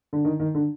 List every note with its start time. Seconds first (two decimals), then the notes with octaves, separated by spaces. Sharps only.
0.13 D3
0.25 D#3
0.40 D#3
0.55 D3